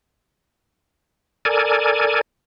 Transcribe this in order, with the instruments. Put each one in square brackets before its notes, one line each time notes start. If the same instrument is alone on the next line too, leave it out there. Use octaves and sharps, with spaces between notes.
[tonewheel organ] A4 A#4 D5 G#5